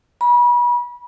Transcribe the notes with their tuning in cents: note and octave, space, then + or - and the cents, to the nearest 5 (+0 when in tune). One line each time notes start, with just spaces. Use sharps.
B5 -35